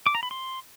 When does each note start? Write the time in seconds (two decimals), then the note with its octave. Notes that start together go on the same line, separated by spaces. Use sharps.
0.06 D6
0.15 A#5
0.23 B5
0.31 C6